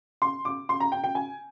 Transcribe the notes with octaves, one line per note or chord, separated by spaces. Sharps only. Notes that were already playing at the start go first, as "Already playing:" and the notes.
C6
D6
C6
A#5
G5
G5
G#5